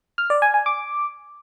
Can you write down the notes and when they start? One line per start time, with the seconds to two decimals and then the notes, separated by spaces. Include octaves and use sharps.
0.18 F6
0.30 D5
0.42 G#5
0.54 G#5
0.66 D6